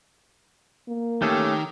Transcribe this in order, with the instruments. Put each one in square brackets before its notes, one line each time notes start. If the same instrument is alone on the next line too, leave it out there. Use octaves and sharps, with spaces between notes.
[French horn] A#3
[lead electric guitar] D#3 [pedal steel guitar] A3 C#4 A4 [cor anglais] G4